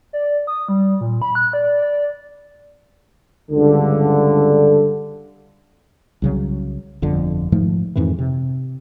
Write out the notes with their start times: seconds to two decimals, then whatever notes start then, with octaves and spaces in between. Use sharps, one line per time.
0.13 D5
0.47 D#6
0.68 G3
1.01 A#2
1.22 B5
1.35 F#6
1.53 D5
1.82 D5
3.50 C#2 G2 D3
6.22 C2 C#3 F#3
7.02 G1 F2 D3
7.52 G#2 D#3 F3 A3
7.95 F2 G#2 D#3 E3
8.19 C3